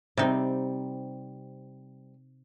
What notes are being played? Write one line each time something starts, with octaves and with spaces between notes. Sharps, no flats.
C3 G3 C4 D#4